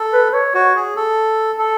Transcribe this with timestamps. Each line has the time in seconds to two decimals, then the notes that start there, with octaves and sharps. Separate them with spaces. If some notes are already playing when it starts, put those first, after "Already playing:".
Already playing: A4
0.14 B4
0.34 C#5
0.54 F#4 C#5
0.75 G#4
0.96 A4
1.58 A4